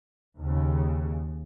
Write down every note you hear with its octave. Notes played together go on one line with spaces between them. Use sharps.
D#2 C#3